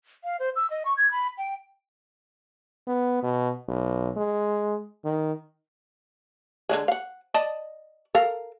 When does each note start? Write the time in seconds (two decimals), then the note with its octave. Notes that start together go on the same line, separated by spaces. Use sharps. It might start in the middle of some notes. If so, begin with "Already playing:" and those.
0.24 F5
0.40 C5
0.56 E6
0.70 D#5
0.85 C#6
0.97 G#6
1.11 B5
1.38 G5
2.87 B3
3.23 B2
3.68 B1
4.17 G#3
5.05 D#3
6.69 D3 F#3 G#3
6.88 F5 F#5
7.34 D5 D#5 A5
8.15 A4 A#4 F5